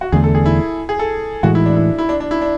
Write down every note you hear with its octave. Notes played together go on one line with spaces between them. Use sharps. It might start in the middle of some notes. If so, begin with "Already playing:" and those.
F#4
E2 D3 A3 D4 G#4
A4
G#4
E4
G#4
A4
A2 E3 G#3 F#4
E4
D4
E4
E4
D4
D4
E4
D4